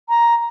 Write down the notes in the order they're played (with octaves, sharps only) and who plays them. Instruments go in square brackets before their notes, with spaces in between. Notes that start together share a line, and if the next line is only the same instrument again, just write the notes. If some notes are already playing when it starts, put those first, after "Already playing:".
[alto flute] A#5